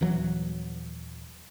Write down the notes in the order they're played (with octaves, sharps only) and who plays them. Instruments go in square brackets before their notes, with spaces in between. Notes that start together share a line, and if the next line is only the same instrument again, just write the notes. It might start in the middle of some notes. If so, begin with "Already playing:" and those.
[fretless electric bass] D#1 E3 F#3